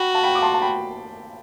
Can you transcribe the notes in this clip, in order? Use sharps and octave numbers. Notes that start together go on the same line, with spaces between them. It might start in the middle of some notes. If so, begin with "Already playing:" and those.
Already playing: F#4 G5 B5
A5
G5 B5
D6
A5 C6
A5
G5 B5